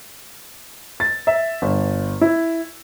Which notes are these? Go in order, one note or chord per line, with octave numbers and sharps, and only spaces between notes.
A6
E5
G1
E4